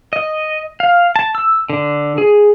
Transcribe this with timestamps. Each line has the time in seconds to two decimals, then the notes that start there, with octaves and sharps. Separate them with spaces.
0.13 D#5
0.80 F5
1.16 A5
1.35 E6
1.70 D3
2.18 G#4